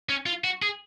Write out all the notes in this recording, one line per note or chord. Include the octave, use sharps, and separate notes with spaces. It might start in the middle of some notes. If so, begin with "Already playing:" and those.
C#4
F4
F#4
G#4